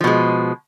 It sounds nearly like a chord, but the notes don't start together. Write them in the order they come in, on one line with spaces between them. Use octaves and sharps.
F3 B2 G#3